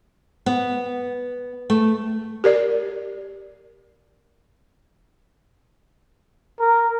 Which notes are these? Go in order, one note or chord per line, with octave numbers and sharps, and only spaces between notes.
B3
A3
G4 A#4 D5
A#4